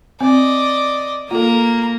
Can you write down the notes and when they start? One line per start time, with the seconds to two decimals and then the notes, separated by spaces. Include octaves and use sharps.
0.21 C4 D5 D#5
1.31 A#3 F4 A4 A#5